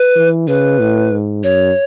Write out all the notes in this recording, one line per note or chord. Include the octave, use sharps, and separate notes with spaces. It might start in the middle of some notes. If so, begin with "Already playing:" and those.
Already playing: B4
E3
C#3 B4
A2
G#2
F#2 C#5